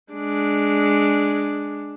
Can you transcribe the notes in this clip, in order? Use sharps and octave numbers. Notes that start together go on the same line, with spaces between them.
G#3 D4